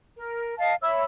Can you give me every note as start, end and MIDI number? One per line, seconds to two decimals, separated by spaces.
0.17 0.53 70
0.58 0.74 75
0.58 0.74 77
0.58 0.74 81
0.82 1.04 73
0.82 1.04 76
0.82 1.04 83
0.82 1.04 88